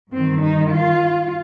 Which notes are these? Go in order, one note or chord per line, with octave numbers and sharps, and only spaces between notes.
G2 D#3 C4
D#4
F4